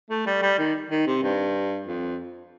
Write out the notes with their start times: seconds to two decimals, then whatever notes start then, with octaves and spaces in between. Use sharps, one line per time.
0.10 A3
0.26 G3
0.42 G3
0.59 D#3
0.91 D#3
1.07 C3
1.23 G2
1.87 F2